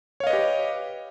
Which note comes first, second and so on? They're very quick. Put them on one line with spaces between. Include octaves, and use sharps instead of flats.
C#5 F5 D#5 B4 G4